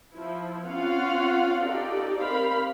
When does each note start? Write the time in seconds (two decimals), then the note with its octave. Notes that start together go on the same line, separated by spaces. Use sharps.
0.12 F3 E4
0.67 C4 C#4 F4 F5 F#5
1.65 D#4 G4 A4 D5
2.18 C4 A#4 C5 F5 B5